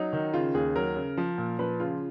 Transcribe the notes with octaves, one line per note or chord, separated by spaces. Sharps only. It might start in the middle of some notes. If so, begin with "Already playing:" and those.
Already playing: F#3 D#4
D#3
C#3 F4
D#2 G#4
F#3 A#4
C#3
F3
A#2
F3 B4
C#3 F4